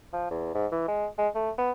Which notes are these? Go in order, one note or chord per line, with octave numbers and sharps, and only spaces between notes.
F3
E2
G#2
E3
G#3
G#3
A3
B3